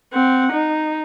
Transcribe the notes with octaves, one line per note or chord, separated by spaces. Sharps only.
C4 F#5
D#4